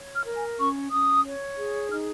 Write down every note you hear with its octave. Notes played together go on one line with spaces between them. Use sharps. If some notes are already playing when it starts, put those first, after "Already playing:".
Already playing: C#5
F6
A#4
G#5
C#4 C#6
C#4 D#6
C#5
G#4
D#4 F6